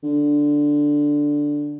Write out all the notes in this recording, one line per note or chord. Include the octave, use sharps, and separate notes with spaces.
D3